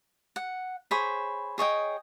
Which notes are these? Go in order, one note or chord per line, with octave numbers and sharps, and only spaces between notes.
F#5
G#4 C5 C#5 B5
G#4 C#5 D#5 G5